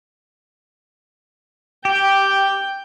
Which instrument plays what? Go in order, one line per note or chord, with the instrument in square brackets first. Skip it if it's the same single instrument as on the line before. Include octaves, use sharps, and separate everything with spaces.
[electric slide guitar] G4 [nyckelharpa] G5